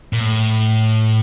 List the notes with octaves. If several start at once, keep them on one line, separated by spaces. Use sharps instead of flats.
A#2
A2